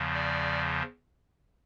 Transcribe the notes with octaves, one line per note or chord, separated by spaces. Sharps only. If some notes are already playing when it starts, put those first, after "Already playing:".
Already playing: E2 C#3 F3
D5